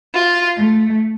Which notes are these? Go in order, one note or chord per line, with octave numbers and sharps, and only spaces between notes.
F4
A3